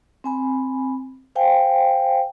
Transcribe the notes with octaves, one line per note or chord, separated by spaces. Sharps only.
C4 G#5 B5
C5 F5 G5 G#5